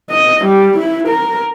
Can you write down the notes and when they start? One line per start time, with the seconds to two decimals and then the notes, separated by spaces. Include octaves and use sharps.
0.11 D#5
0.45 G3
0.78 E4
1.08 A#4